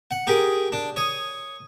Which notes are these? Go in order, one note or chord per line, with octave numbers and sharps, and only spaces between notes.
F#5
G4 G#4 A#4
D4
C#5 D#6